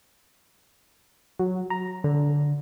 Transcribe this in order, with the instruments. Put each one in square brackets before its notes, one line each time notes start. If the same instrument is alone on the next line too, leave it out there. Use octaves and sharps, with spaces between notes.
[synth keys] F#3
A#5
D3